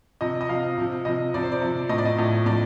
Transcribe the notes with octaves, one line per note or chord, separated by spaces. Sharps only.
C3 F3 D#5
D#5
C3 F3 F5
C3 F3
C3 F3 D#5
C3 F3 D5
C5
D5
C3 F3
A2 F3 D#5
D5
D#5
A2 F3
A2 F3 D5